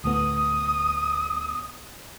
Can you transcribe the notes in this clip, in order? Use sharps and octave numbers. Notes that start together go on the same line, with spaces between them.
D2 A2 B3 D#6